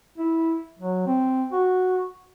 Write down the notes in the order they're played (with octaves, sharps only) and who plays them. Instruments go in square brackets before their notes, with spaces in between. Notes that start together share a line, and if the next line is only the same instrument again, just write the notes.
[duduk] E4
F#3
C4
F#4